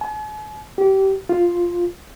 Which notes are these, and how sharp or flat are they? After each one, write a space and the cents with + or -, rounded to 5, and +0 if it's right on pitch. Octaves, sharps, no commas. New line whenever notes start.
G#5 +45
G4 -25
F4 +0